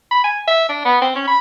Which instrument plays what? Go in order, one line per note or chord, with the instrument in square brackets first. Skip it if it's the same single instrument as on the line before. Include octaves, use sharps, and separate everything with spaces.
[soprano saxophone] B5
G#5
E5
D4
B3
C4
C#4
B5